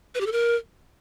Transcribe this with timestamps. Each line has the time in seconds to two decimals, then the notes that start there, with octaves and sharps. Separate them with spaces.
0.15 B4
0.21 G4
0.26 A4
0.32 A#4